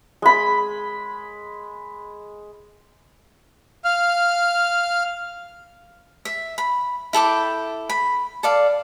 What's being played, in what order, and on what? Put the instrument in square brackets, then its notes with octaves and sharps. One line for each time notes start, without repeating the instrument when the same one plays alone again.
[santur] G#3 B5
[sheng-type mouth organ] F5 F6
[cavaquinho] E5
B5
E4 A4 G5 D6
B5
A4 D5 F5